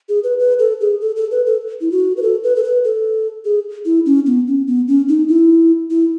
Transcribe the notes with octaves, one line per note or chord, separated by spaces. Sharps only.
G#4
B4
B4
A4
G#4
A4
A4
B4
A4
E4
F#4
B4
A4
B4
A4
B4
A4
G#4
E4
C#4
B3
C#4
B3
C#4
D#4
E4
E4